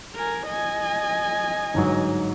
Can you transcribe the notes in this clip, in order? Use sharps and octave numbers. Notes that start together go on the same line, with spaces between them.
A#4 G#5
D#5 G#5
G1 G#2 F#3